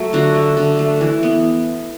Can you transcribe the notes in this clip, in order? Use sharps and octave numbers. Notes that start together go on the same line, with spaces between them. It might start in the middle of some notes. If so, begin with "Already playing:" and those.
Already playing: F#3 A3
D3 F#4
A3
D3
A3
E3
B3